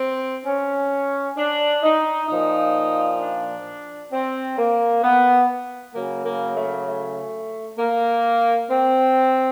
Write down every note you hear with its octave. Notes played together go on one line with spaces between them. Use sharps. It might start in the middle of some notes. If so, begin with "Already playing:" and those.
Already playing: C4
C#4
D4
D#4
A#2 F3 D#4
D4
C4
A#3
B3
C#3 F#3 A#3
A#3
A3
A3
A#3
C4